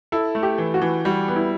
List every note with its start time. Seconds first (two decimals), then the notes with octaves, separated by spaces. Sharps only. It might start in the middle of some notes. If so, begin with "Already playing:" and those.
0.12 E4 A4
0.35 A3
0.43 G4
0.58 E3
0.74 F#4
0.82 E3
1.05 G3 F#4
1.28 B3
1.36 E4